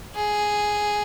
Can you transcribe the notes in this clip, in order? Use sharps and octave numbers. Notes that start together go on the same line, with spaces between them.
G#4